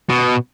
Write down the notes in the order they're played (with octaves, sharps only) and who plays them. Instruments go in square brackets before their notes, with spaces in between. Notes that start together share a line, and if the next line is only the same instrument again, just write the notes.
[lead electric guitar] B2